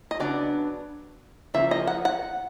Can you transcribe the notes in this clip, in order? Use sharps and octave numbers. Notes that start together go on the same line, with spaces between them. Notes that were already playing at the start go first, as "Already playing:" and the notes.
D#5
C#3 F#3 B3 D4 D5
E2 C#3 F3 A#3 E5
D#5
F#5
F#5